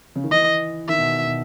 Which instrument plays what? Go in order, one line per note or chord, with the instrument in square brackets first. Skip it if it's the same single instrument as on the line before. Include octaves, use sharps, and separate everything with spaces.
[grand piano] C#3
D#3
[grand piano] E3 [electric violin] D#5
[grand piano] D#3 [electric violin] E5
[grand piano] B2
B2